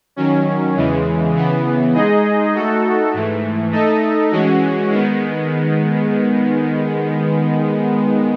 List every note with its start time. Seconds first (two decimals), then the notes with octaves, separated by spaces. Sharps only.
0.16 D#3 F#3 C#4
0.76 E2 C#3 E3 G#3
1.35 C#3 E3 B3
1.94 G#3 D#4 G#4 D#5
2.54 A3 D#4 F#4 A4
3.14 G#2 E3 A3
3.72 A3 D#4 A4 D#5
4.31 E3 G#3 C#4 F#4
4.91 D#3 G#3 B3